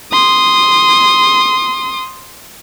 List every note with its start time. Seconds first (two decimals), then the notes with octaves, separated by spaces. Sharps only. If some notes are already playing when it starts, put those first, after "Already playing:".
0.12 C6 D#6